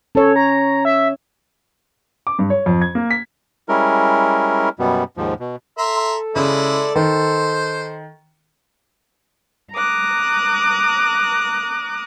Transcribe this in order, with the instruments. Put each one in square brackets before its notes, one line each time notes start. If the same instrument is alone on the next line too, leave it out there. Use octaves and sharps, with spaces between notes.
[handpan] C#4 C#5 [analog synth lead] A4
[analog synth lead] A#5
E5
[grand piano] D6
G2
C#5
F2
G#6
A#3
B6
[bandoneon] G3 G#3 C#4 E4 A#4
F#2 B2 G3 B3
D#2 G#2 F3
B2
[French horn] A4 [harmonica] E5 A#5 C6
[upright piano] C#3 [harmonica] G#3 E4 D5
[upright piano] D#3 [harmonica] C5
[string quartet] A#5 D6 D#6 F#6